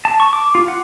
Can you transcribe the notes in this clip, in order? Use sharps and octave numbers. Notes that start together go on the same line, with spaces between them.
A5
C#6
D6
F4
F#5